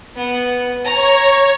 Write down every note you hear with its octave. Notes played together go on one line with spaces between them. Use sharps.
B3
C#5 A#5